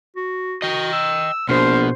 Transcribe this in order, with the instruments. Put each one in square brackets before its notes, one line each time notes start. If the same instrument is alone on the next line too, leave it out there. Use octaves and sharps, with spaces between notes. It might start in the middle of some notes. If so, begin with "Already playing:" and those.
[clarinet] F#4
[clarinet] F#4 [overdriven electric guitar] D#5 G5
[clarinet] E6
[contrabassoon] A#1 [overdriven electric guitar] B2 [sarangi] C5 [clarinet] F6